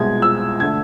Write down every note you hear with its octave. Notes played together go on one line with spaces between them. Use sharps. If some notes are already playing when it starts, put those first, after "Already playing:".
Already playing: C2 B2 G#3 G#6
E6
D3 A3 G#6